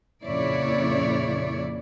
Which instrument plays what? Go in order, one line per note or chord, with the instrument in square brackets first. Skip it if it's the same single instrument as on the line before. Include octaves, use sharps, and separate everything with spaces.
[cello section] F2 A#2 C#3 E4 C#5 D5